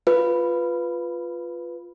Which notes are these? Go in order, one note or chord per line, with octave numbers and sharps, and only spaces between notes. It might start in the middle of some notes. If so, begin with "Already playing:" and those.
F4 B4